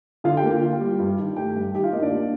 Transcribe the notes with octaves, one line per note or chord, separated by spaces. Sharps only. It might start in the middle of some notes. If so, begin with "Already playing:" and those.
D3 F4 F5
G4 G5
A#3
F4
G3
G2
D#3
A3 G4 G5
G2
D#3 G4 G5
F4 F5
A#3 D#4 D#5
D4 D5
A#3